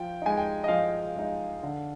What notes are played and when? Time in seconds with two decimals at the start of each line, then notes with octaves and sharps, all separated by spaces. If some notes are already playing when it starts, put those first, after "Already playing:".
Already playing: F3 G5
0.22 G#3 D#4 G#5
0.37 G5
0.64 D#5
0.68 F3 F5
1.16 G#3 D#4
1.63 D3